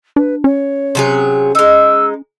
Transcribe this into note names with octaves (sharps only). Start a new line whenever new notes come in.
D4 B4
C#4 C#5
C3 F#3 G#4
G#3 D#4 E6